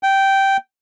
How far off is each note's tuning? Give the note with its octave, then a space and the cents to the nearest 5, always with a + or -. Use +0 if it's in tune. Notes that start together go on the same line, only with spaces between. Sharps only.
G5 -10